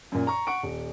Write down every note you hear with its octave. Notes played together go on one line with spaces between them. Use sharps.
F#2 A#2
A#5 C#6
F#5 C#6 D7
D#1